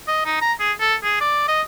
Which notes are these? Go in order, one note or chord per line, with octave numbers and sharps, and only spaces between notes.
D#5
D#4
A#5
G#4
A4
G#4
D5
D#5